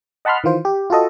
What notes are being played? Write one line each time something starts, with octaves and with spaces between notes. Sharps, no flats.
D#5 F#5 A5 B5 C6 F6
D#3 E3 F4 C5
G4
F4 F#4 A4 D#5